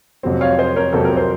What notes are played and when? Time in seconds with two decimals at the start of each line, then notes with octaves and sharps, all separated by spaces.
0.23 F2 C3 F#3 C4
0.41 C#5 F5
0.59 C5 D#5
0.76 A#4 C#5
0.93 F2 C3 F#3 C4 A4
1.05 A#4
1.17 C5